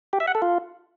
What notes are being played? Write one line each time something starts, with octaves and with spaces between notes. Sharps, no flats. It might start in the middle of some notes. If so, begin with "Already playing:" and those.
G4
E5
F#5
A4
F4